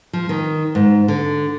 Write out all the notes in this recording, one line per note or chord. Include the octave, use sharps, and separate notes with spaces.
F3
D#3
G#2
D3